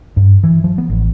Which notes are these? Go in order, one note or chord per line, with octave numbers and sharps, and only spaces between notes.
G2
E3
F3
B3
A1